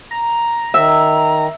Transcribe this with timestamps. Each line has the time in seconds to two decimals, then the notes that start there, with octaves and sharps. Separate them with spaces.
0.11 A#5
0.74 D#3 E5